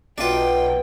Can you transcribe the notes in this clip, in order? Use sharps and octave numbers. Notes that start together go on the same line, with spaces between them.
B1 B2 D4 D#4 F4 E5 G5